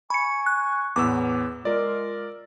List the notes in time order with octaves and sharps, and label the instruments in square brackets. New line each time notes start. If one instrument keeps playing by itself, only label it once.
[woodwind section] G#5 C#6 [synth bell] B5 C#7
[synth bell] F#6
[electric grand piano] E2 B3 E6 [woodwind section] A2 [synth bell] D6
[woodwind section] G#3 F4 [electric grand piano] A#4 D5